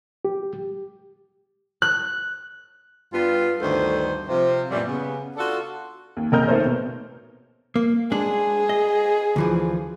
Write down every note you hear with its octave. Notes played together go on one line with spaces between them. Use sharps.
G4
F#6
G2 G3 B3 F4
D2 G2 D#3 B3 A4 C5
C3 F3 C5
F#2 A#2 E3 F#3 G3
C#3 B3
D4 F4 F#4 A4
D#2
F#1 D#2 A#4 D#5 F6 G6
D#3 A3 A#3 A4 C5 C#5
B2
A#3
G#3 D4 G#4
D#5
D2 E3 F3